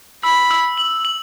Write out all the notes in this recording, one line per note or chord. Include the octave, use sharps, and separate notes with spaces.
B5 E6
E6
F#7
F#7